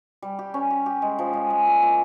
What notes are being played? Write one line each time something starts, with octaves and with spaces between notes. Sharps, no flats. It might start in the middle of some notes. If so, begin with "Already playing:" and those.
G3
G4
C#4
G4
G4
G#3
F3
G#3
G#3
A#2
A#2